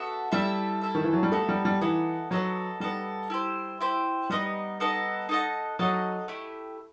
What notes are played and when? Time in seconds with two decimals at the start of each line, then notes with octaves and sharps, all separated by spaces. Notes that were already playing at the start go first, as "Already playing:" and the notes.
Already playing: B3 F#4 A4 E5
0.32 G3 E4 A4 E5
0.81 E4 A4 E5
0.95 D#3
1.04 E3
1.13 F#3
1.23 G3
1.32 A3 B3 D#4 A4
1.49 G3
1.65 G3
1.81 E3 B3 D#4 A4
2.31 F#3 B3 D#4 A4
2.80 G3 B3 D#4 A4
3.30 E4 G4 C5
3.81 E4 G4 C5
4.30 G3 B3 D#4 A4 D#5
4.80 B3 D#4 A4 D#5
5.29 D#4 A4 D#5 F#5
5.79 F#3 D#4 A4 D#5 F#5
6.28 A3 E4 G4